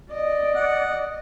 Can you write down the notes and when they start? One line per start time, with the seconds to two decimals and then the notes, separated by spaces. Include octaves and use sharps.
0.12 D5 D#5
0.55 F#5